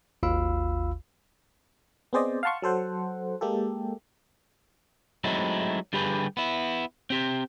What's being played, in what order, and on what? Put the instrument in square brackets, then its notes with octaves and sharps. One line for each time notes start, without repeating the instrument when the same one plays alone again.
[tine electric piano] G#1 D#2 F4 F5 B5 E6
[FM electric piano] B3 C4 G#4 C5 D5 D#5
F5 F#5 A5 C6 C#6
F#3 A4 C5 F#5
G#3 A#3 G4 A4
[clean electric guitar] F#3 G#3 A3 C4 D#4 E4
D3 G3 G4 G#4 B4
B3 E4
C4 G4